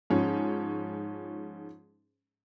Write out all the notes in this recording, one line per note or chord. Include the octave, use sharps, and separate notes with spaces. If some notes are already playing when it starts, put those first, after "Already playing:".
G#2 F3 C#4